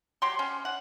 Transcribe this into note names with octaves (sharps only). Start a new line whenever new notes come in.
F#3 G4 C6
C#4
F#5